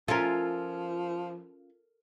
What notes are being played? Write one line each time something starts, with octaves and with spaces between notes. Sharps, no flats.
F3 C#4 F4 A4 A#4